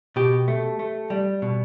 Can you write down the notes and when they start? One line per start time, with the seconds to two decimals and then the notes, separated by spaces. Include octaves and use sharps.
0.16 B2 G4
0.48 A3
0.79 A3
1.10 G3
1.42 B2